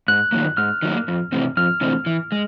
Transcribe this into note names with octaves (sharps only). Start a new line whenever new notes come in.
G#2 F#6
D#3 F#3 A#3
G#2 F6
D#3 F#3 A#3
F2
C3 E3 A3 C4
F2 F6
C3 E3 A3 C4
E3
G#3